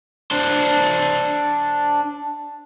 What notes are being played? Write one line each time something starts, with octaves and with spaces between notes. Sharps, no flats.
D4 C5